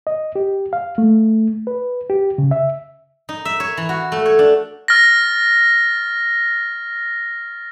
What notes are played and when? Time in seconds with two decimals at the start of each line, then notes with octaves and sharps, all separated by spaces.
0.07 D#5
0.36 G4
0.73 F5
0.98 A3
1.67 B4
2.10 G4
2.38 C#3
2.51 E5
3.29 D#4
3.45 E5
3.60 C#5
3.77 E3
3.89 F#4
4.12 A3
4.25 C#5
4.39 D4
4.88 F6 A6 A#6